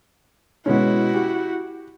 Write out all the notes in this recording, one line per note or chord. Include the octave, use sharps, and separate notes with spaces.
B2 G#3 C#4 E4 F#4
G4